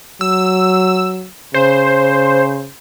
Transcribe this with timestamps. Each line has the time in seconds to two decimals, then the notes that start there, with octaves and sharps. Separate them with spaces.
0.21 F#3 E6
1.54 C#3 C5